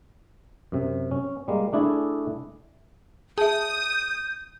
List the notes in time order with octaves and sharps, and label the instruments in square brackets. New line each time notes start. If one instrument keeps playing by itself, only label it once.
[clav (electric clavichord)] F#2 C3
C#4
G3 G#3 A#3
A3 D4 E4 G#4 A4
[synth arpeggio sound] G#4 [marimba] E5 A5 [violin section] D#6 [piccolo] G6